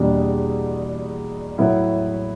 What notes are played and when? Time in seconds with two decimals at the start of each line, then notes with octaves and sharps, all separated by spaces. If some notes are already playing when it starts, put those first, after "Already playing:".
Already playing: E2 B2 G3 A#3 D4
1.58 A2 F#3 B3 E4